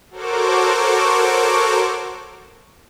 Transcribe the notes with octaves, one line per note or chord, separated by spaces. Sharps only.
F#4 A4 A#4 C5 C#5 D6